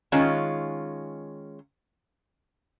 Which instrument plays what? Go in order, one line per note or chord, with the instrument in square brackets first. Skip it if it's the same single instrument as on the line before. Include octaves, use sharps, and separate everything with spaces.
[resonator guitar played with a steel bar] D#3 G#3 C#4 F4